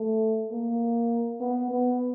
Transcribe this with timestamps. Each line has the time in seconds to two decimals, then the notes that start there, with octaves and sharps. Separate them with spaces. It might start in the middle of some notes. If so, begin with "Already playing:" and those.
Already playing: A3
0.52 A#3
1.41 B3
1.71 B3